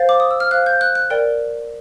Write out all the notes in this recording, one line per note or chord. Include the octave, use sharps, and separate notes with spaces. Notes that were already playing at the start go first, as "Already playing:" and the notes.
Already playing: C5 F5 A6
D6
D#6
E6
F6
C5 F5 F#6
G6
F#6
F#6
A#4 D5 G5